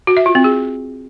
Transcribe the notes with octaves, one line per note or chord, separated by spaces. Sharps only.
F#4
E5
F4
C4
G#4